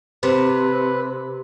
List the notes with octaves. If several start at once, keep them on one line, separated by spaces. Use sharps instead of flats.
C3 B4